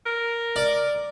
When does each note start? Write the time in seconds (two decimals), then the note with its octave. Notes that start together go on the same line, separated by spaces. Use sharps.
0.06 A#4
0.56 D5